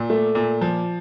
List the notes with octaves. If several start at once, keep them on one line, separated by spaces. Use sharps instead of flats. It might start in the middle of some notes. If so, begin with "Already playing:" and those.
Already playing: A#2
A3
A#2
F3